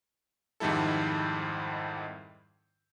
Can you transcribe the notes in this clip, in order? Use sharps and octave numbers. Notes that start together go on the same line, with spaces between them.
F2 G#2 D#3 G3 E4 A4